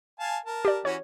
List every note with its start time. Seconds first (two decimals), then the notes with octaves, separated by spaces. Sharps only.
0.20 F5 G#5 A5
0.46 A#4 A5
0.65 G4 D5
0.85 E3 C#4 F#4 C#5